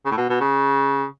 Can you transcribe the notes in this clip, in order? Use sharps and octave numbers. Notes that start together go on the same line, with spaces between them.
C#3
A2
B2
B2
C#3